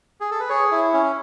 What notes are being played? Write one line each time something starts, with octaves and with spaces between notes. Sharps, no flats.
G#4
A4
B4
G#4 C#5
E4
C#4